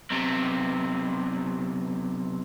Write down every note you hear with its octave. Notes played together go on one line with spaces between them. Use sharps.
B1 C3